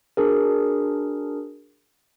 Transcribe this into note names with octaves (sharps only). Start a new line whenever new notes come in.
D4 F#4 G#4 A#4